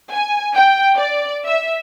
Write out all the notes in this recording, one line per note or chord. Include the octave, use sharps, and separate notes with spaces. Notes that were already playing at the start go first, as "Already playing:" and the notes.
G#5
G5
D5
E5